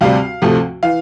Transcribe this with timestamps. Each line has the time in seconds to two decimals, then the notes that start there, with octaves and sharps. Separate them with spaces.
0.01 D2 C3 G3 F5
0.42 D2 C3 F3 A3
0.82 E3 F5